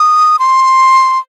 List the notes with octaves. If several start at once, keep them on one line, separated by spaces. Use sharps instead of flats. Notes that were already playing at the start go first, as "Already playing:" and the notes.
Already playing: D#6
C6